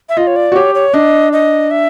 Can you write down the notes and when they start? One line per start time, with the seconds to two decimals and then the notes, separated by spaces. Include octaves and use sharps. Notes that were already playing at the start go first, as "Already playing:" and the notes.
0.09 E5
0.17 F4 D#5
0.27 C#5
0.36 D5
0.52 F#4
0.56 G4 C#5
0.75 C#5
0.94 D4 D#5
1.33 D#5
1.71 E5